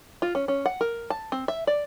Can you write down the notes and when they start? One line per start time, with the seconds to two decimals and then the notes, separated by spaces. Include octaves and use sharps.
0.22 F4
0.35 C#4
0.48 C#4
0.66 F#5
0.81 A#4
1.10 A5
1.32 C4
1.48 E5
1.67 D5